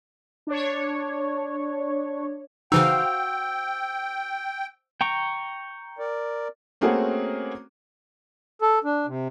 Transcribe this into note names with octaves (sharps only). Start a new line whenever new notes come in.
D4 C#5
C#3 E3 D#4 F#4 C5 F5 G5 E6
G5 A#5 C#6
A#4 D5
A3 A#3 C4 C#4 F#4 G#4
A4
D4
C3